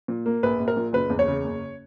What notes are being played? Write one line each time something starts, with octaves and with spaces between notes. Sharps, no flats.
A#2
A#3
A#1 B4
A#1
A#4
A#2
F#1 B4
E2
C#5
C#3
F#1